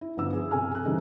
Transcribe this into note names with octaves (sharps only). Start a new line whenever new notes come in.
E4
G1 F3 B3 E4 E6
G#4
C3 A4 G#5 F6
G#4 F#6
D#3 E3 G3 C4 D#4 E4